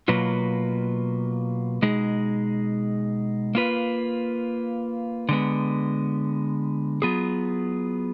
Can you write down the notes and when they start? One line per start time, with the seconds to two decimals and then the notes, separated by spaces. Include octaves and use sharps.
0.08 B2 F#3 A#3 F4 B4
1.82 B2 G#3 D#4 G#4
3.55 A#3 F4 B4
5.29 D3 G#3 B3
7.02 F#3 B3 F4 G#4